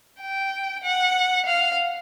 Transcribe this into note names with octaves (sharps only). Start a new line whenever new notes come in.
G5
F#5
F5